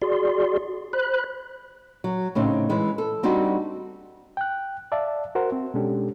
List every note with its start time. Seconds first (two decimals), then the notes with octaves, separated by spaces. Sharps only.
0.02 F#4 G#4 D5 C6
0.93 C5 B5 F#6
2.04 F#3
2.35 A2 C#3 C4 D#4
2.69 E3 G#3
2.98 A4
3.23 G3 C4 D4 D#4 F#4
4.37 G5 F#6
4.92 D5 E5 F5 A5
5.35 F#4 A#4 C5 F#5
5.52 C4
5.74 B2 G#3 C#4 D4 G4 A4